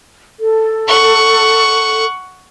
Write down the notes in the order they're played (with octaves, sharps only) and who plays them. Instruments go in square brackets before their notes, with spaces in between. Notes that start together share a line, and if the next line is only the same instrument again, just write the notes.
[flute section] A4
[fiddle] F#5 C#6